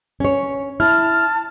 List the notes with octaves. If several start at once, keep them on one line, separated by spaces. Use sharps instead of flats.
C#4 C#5
E4 A5 F6